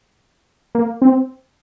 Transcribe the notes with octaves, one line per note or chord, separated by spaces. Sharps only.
A#3
C4